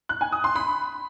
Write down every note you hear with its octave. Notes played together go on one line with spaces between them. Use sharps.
F#6
G#5
D#6
C6
B5